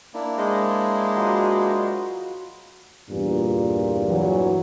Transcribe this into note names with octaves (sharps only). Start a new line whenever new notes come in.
A#3 D4 E4
G#3 C5 D#5
F#3 F4 B4
E2 G2 A#2
E3 F#3